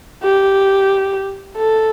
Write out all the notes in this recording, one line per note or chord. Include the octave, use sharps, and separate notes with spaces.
G4
A4